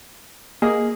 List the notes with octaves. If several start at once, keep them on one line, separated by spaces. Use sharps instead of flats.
A#3 G#4 D#5